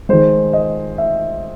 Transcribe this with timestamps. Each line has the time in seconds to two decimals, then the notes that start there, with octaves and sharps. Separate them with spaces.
0.09 D#3 G#3 C5
0.53 D#5
0.98 E5